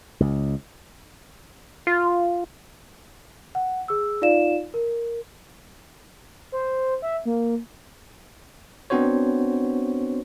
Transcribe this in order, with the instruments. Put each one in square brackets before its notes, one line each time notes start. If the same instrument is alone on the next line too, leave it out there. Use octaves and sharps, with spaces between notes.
[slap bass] C#2
[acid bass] F4
[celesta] F#5
G#4 E6
D#4 F4 D5 F5 E7
A#4
[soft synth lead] C5
E5
A#3
[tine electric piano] B3 C4 D4 F#4 C5 C#5